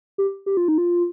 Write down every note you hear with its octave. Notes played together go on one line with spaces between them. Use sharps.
G4
G4
F4
D#4
F4